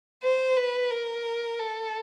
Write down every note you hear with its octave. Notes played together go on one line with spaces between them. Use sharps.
C5
B4
A#4
A4